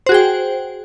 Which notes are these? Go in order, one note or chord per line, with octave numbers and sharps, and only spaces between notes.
F#4 G#4 C5 G5